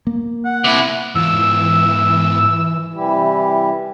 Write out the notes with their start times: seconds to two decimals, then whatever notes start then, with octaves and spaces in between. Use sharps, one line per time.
0.07 A#3
0.45 F#5
0.64 C3 E4
1.15 G#2 E3 F4 E6
2.93 C3 E3 G3 E4 G4